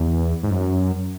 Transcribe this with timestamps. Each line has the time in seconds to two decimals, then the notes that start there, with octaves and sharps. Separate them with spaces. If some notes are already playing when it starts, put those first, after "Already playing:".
Already playing: E2
0.43 G#2
0.51 F#2